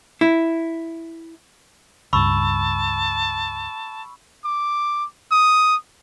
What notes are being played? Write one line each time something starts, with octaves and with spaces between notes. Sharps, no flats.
E4
C#2 G2 A5 B5 C#6 E6
D6
D#6